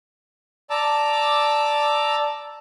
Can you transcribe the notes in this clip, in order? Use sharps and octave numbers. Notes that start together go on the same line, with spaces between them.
D5 A5 A#5 D6 E6